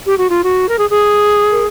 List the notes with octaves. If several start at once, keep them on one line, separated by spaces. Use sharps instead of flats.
G4
F#4
F4
F#4
A#4
G#4
G#4
A#4